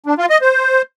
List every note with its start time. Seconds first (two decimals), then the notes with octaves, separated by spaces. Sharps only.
0.06 D4
0.18 F4
0.30 D#5
0.41 C5